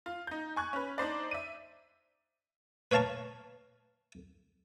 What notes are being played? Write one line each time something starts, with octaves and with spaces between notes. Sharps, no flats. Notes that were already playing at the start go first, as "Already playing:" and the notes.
F4
D#4 G6
G#5 C#6 F#6 G#6
C#4 B4
D4 D#4 C5 D5
E5 D#7
B4 C#5 F5 A5 A#5 C#6